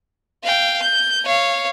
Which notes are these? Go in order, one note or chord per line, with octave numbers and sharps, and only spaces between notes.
F5 G5
G6
C#5 F5